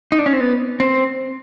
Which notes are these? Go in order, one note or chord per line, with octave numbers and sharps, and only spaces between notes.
D#4
D4
C#4
C4
B3
C4